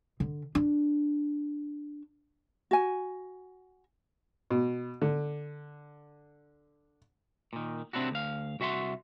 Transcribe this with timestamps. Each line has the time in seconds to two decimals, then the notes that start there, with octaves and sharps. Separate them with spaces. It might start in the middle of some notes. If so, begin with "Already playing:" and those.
0.20 D3
0.55 D4
2.71 F#4 G#5
4.51 B2
5.02 D3
7.53 A#2 D#3
7.93 C3 C4 D4 E4 F#4
8.11 D2 F5
8.60 C2 F#4 E5 F#5 C6